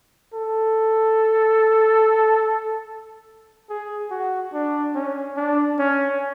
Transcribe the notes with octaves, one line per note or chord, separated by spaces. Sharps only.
A4
G#4
F#4
D4
C#4
D4
C#4